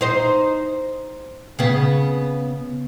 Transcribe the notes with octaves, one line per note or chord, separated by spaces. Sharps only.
D#4 C5
C#3 B3